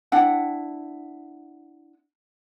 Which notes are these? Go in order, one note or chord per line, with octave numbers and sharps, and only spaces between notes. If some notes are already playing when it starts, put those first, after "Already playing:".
D4 E4 F#5 G5